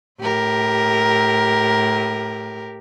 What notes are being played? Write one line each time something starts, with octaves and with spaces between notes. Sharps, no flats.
A2 G4 A#4